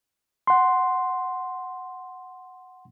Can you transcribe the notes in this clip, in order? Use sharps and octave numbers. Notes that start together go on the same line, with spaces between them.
F#5 C6